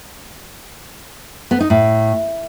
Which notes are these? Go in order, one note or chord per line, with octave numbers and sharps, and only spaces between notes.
B3
D#4
A2